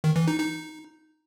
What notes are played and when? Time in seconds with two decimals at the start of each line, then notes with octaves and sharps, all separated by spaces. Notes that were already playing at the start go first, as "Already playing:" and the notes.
0.04 D#3
0.16 E3
0.28 D#4
0.39 D#4